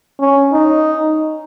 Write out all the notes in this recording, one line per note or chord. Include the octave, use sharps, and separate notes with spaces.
C#4
D#4